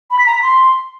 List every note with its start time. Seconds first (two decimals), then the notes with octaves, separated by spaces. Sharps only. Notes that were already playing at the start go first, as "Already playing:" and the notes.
0.11 B5
0.19 B6
0.26 A#5
0.34 B6
0.42 C6